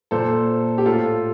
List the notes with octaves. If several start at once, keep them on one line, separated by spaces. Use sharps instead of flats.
A#2 A4 C5
G4
A2 F4 A4